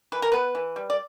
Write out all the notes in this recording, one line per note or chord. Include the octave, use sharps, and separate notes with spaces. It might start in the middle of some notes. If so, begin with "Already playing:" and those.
E3 B4
A#4
B3 B4
E3
G3
D5